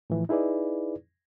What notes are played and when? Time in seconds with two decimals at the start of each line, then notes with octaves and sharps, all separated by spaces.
0.10 A2 E3 F3
0.29 D#4 E4 G#4 B4 D5